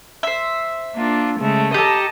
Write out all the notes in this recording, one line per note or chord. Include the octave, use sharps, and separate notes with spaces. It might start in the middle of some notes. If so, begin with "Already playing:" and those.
C5 E5
A#3 D4 F4
C#3 G#3 A3
G4 A4 D#5 A5 A#5